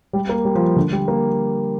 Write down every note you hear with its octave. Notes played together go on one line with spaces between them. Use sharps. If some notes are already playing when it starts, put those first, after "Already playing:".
G3
A#3
G3
F3
D3
G3
A#3